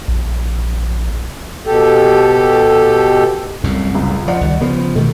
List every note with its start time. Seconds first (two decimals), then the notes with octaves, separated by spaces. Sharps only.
0.08 A#1
1.66 B2 G4 A4
3.64 C2 F#2 A2
3.95 C#2
4.28 F3 D5 D#5 F#5
4.41 C#2 D#3 G3
4.61 C#3 F3 B3
4.95 B2 D#3 E3 A3